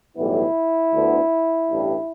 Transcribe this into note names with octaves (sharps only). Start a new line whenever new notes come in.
B1 A2 E3 G3 B3 E4
D2 D3 B3
A1 G2 G3